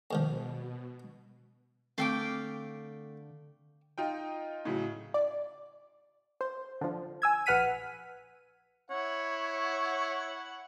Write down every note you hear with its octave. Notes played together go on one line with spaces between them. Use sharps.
G#2 B2 D#3 F3
D3 A3 C4 F5 G5 D6
D#4 F4 G5
A2 C#3 F#3
D5
C5
D3 F3
G#5 E6 G#6
A#1 B4 F#5 F6 B6 D#7
E4 C#5 F#5